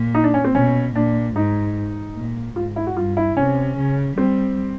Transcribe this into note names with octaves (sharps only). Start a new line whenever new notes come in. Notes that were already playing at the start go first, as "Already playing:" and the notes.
Already playing: A#2
D#4
D4
C#4
C4
B2 C#4
A#2 D4
G#2 D#4
A#2
G#2 F4
E4
F#4
G2 F4
E4
C3 C#4
C#3
G3 C4